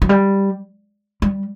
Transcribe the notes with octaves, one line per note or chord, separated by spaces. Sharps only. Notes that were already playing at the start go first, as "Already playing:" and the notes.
F#3
G3
G3